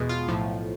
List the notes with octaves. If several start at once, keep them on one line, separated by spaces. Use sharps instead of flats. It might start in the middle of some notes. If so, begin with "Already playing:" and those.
Already playing: E2 B2 G#3
F4
B1 A2 F3